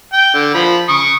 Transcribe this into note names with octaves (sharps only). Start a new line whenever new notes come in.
G5
D3
F3 B5
C#6 D#6